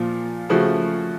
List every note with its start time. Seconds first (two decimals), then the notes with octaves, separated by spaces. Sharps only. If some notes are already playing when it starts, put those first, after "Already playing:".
Already playing: A#2 F3 F4
0.49 C#3 F3 A3 C#4 F#4